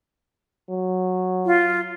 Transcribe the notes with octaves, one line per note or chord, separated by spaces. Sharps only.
F#3
F4